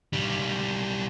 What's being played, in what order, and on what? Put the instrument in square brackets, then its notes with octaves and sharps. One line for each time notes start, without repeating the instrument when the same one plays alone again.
[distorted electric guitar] B1 G3